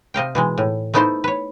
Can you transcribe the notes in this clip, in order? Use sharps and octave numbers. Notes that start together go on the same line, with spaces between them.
C3 D#5 F5 G5
B2 E3 G#3
A2
A3 B3 D#4 E4 A4 C5
B4 C#5